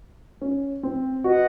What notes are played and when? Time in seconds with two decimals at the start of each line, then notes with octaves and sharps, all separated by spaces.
0.42 C#4
0.83 C4
1.24 F#4 B4 D#5 F#5